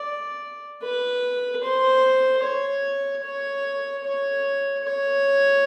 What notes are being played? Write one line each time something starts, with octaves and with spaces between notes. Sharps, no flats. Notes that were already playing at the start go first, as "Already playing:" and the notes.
Already playing: D5
B4
C5
C#5
C#5
C#5
C#5